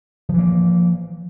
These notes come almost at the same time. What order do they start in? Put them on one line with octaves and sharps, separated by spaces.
F3 E3 A#3